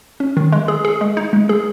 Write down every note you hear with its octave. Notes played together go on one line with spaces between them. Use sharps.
C#4
D#3
G#3
G#4
G#4
G#3
D#4
G#3
G#4